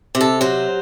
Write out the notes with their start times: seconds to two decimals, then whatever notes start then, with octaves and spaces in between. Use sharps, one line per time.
0.15 C3
0.21 A4
0.41 F#3 C5